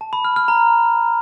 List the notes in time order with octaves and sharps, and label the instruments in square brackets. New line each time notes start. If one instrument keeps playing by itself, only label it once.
[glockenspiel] A5
B5
F6
F6
A#5